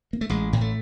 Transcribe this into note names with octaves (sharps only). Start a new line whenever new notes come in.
A#3
A3
A1 G#3
A2 A#3
A3